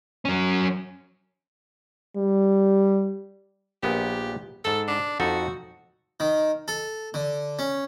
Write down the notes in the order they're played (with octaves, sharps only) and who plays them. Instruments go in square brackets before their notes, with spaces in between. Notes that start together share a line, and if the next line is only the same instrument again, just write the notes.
[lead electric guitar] F#3 C#4
[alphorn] G3
[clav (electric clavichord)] A#1 A#2 B3 [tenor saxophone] G4
[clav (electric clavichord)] G#2 A5 [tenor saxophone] A4
[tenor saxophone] D4
[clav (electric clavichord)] F2 D#4 A4 [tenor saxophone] F#4
[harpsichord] D#3
A4
D3
C#4